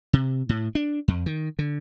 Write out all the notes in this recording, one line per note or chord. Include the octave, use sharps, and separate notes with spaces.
C3
A2
D4
F2
D#3
D3